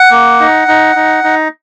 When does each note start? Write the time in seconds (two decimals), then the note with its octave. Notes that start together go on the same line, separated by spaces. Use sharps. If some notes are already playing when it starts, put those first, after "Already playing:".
Already playing: F#5
0.11 A#3
0.40 D#4
0.68 D#4
0.96 D#4
1.24 D#4